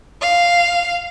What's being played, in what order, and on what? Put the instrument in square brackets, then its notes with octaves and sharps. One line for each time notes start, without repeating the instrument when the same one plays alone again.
[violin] F5